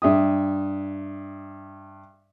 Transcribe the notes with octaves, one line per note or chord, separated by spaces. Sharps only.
G2 E5 D#6